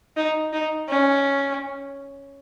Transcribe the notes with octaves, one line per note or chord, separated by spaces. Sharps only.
D#4
D#4
C#4